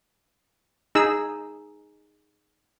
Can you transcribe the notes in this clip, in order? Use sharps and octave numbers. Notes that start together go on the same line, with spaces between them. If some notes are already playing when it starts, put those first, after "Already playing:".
D#4 G#4 E6